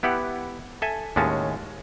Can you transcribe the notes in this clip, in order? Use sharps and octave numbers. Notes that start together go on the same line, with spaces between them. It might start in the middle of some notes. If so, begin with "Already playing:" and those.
B3 E4 G4 F#5
A4 E5 G#5
D#2 A2 G#3 C#4 A5